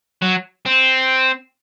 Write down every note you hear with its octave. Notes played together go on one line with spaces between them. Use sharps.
F#3
C4